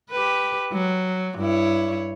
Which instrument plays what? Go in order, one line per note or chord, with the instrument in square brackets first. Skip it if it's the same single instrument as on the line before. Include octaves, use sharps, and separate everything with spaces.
[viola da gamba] G4 B4
F#3
G2 E4 C#5